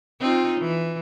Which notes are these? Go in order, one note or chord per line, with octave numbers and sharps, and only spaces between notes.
C4 D#4 F4
E3